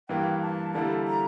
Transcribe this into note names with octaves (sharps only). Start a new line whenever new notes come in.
G2 E3 A#3 G5
A5
D3 G3 A#3 E4 A4 A5
A#5